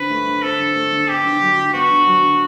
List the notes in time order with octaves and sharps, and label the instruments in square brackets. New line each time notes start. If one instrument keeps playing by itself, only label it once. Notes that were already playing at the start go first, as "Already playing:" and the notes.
Already playing: [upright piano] D3 C4 [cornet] B4
[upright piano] A3
D3
[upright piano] C4 [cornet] A4
[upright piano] D3
A3
D3
[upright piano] B3 [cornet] G4
[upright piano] D3
F#3
D3
[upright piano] B3 [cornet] F#4
[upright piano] D3
F#3
D3